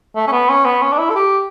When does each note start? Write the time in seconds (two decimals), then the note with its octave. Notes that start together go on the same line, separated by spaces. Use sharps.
0.16 A3
0.27 C#4
0.32 B3
0.49 C#4
0.65 B3
0.82 C#4
0.92 D4
0.98 E4
1.10 A4
1.15 G4